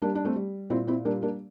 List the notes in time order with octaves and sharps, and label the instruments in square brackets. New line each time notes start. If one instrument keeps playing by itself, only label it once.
[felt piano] G3 A#3 D4
D4
A3 C4
G3
A#2 C4 E4
C4 E4
G3 A#3 D4
A#3 D4